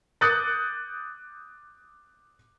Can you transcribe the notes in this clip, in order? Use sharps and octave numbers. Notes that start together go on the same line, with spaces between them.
D6 D#6 F#6 G6 A6 C#7